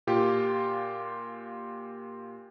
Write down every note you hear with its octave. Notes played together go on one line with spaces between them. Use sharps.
A#2 F4 G4